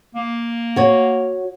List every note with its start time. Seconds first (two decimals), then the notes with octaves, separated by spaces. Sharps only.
0.15 A#3
0.76 F#4 C#5